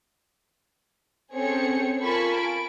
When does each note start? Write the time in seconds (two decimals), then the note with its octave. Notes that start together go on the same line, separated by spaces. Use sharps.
1.33 C4 C#4 G#4 A4 C#5 C#7
2.02 F4 A#4 G#5 A5 B5 C#6
2.36 D7